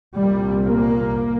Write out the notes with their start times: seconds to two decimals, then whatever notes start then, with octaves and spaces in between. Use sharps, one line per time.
0.17 C2 A#2 G3
0.63 A#3